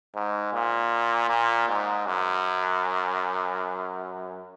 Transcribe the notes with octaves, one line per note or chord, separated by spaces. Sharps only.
G#2
A#2
A#2
G#2
F#2